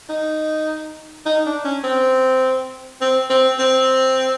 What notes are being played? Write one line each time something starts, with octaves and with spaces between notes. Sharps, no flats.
D#4
D#4
D4
C#4
C4
C4
C4
C4